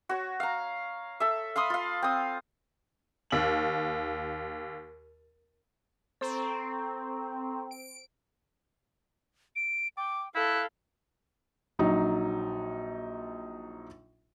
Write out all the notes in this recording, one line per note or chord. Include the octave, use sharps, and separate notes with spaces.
F#4 C#5
F5 A#5
A4 E5
F5 B5 C6 D#6
F4 F5
C4 D#6
D#2 F#7
C4 A4 A#5 C#6
D7
D7
G5 D6
E4 A4 F5 F#6
A#1 F#3 D#4